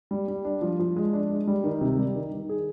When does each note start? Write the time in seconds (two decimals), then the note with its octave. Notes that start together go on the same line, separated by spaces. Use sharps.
0.11 G3
0.28 G3
0.45 D4
0.62 F3
0.79 F3
0.96 G#3
1.13 D4
1.30 G#3
1.47 G3
1.64 D#3
1.81 C3
1.98 G3
2.15 D#3
2.32 D#3
2.49 G#4